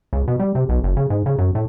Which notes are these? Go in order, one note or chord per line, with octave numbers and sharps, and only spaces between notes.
C#2
B2
G3
C3
B1
F#1
C#3
G#2
C#3
F#2
A2